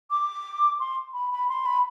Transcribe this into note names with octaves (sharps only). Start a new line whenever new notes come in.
D6
C6
B5
B5
C6
B5